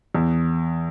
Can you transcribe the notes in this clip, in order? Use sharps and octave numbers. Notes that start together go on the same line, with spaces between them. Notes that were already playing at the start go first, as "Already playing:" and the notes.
E2